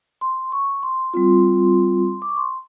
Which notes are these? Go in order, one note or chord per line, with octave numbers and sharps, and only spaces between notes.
C6
C#6
C6
G3 C4 F4
D6
C#6
C6